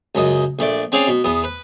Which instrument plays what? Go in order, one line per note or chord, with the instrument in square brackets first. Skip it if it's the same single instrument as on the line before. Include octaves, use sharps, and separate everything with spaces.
[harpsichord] C#2 F#2 D#5
A#1 A3 D5
C4 C#4 G#4 D5 F5
B2
E2 B3 D#6
B4